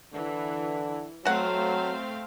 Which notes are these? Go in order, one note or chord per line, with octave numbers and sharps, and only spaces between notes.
D3 E3
F#3 A3 C4 F#4 F5 F#5